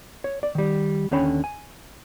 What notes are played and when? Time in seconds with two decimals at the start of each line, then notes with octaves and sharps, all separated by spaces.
0.24 C#5
0.43 D5
0.55 D#3 G3
1.11 D#2 D3 C#4 C#5 G5 B5
1.44 G#5